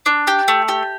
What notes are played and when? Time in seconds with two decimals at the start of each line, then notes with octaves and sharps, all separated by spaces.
0.06 D4
0.27 G4
0.48 A3
0.68 G4